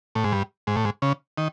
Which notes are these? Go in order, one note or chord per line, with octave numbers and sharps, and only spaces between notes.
A2
G#2
G2
G#2
A2
G#2
C#3
D#3